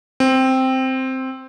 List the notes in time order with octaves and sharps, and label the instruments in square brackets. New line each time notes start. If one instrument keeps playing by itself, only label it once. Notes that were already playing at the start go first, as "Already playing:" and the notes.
[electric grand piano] C4